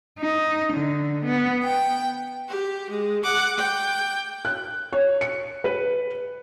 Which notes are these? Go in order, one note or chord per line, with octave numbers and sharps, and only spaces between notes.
D#4
D3
B3
G5
G4
G#3
F#5 D6
G5
F#6
C#5
C#7
B4